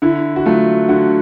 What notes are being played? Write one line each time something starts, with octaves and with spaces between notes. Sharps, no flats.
D3 E4
F#4
F#3 A3 F4
D3 F#4